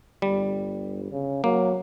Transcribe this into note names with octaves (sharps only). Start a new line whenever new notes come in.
G1 G3
C#3
F#3 A#3